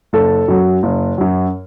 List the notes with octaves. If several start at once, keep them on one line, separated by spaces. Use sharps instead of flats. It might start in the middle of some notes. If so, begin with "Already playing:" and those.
F#1 A4
F#2 F#3
F#1
F#2 F#3